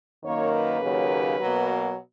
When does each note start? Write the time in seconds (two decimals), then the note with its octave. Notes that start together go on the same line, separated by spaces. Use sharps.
0.24 F#2 D#3 A#3 C#5
0.53 B4
0.81 D#2 C#3 F#3 A#3
1.39 B2 F#3 A#3